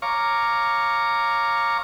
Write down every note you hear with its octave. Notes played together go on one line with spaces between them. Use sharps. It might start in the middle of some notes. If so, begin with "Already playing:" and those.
C#5 F5 A#5 C#6 D6